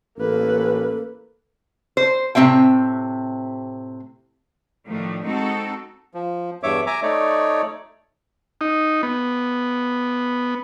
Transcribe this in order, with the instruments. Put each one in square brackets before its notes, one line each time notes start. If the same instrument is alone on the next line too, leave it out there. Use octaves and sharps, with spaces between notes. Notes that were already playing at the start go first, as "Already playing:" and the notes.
[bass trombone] A1 [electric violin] A#3 B4 [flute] A4
[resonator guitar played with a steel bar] C5
A2 C3 C4 E5 G5
[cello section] A2 D#3 F3 A3 D4
G#3 C4 D#4 F#4 A4
[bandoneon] F3
E2 G2 C#5 E5 D6
E5 G#5 A#5 D6
A3 D#4 C#5 D5
[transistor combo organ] D#4
B3